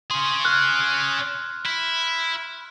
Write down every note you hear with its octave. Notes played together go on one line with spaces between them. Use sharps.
C#4 G#4 C6
F6 F#6
E4